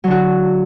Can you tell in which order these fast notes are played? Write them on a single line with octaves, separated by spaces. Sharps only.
F#3 D3 F#4